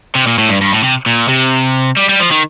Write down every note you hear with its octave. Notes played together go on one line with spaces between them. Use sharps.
C3
A#2
A2
G2
G2
A2
C3
A#2
C3
G3
G3
F3
D#3